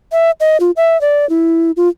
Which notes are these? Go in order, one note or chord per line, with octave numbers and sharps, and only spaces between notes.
E5
D#5
F4
E5
D5
E4
F4